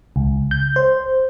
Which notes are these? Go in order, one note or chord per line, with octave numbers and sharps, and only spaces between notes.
C#2
G6
C5